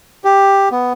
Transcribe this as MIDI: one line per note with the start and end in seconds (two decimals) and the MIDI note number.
0.24 0.69 67
0.71 0.93 59